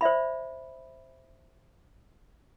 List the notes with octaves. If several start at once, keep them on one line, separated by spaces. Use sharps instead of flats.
C5 D5 E5 B5